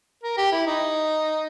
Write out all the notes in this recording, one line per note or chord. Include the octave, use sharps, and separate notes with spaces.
A#4
G4
E4
D#4